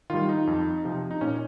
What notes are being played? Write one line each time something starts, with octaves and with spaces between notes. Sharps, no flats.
D#3 G3 F4
D#4
F2
C3 F3
D#4
A#2 C#4